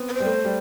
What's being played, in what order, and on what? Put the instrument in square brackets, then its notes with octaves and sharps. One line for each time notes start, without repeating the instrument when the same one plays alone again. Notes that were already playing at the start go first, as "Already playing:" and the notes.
Already playing: [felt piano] B3 C4
[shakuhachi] B4
C5
[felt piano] G3
A3
G3